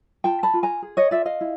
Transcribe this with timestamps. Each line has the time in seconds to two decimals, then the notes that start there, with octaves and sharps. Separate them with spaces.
0.24 F4 G5 A5
0.43 A5 B5
0.54 F4
0.63 G#5 A#5
0.82 G#4
0.97 C#5 D#5
1.11 F4 D5 E5
1.26 D#5 F5
1.41 E4